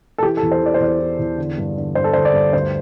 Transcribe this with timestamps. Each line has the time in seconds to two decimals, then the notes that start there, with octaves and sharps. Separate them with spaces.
0.18 A4
0.23 E3 G4
0.37 A4
0.42 E2
0.52 C5
0.61 E3 D5
0.74 C5
0.80 E2 D5
0.99 E3
1.19 E2
1.38 D3
1.58 G2
1.76 D3
1.95 G2 C5
2.04 A4
2.13 D3 C5
2.25 D5
2.34 G2
2.53 D2 C5